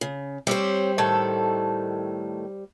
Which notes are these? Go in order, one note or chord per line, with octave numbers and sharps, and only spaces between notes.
C#3
G3 C4 G4 C5 C#5
A2 D#3 A4